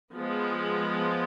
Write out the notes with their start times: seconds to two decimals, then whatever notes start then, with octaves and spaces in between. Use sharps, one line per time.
0.15 F3 G#3 B3